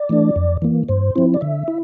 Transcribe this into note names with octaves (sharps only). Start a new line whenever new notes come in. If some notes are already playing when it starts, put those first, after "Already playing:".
Already playing: D5
E3 A3 D4
F2
E3 A#3
G2 C5
F3 C4 E4
D5
D3 E5
E4